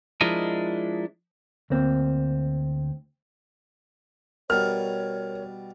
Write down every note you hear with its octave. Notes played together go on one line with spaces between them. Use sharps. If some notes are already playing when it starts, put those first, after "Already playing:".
F3 G#3 D4 E4 A#4 D#5
D2 A#3 C4
B2 G3 A#4 C#5 F6